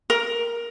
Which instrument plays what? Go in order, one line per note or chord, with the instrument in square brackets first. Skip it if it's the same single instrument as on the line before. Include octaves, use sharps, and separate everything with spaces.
[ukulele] A#4